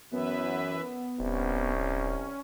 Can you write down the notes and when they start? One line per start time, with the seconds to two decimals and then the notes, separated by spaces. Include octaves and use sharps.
0.12 F#2 E3 B3 B4 E5
1.19 D#1 C2 C#4